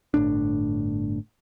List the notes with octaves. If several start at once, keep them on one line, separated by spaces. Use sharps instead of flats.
G1 A2 D4